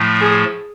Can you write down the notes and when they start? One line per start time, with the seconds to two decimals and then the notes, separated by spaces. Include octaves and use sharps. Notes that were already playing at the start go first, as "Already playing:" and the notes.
Already playing: A2 F3 A3
0.21 G#4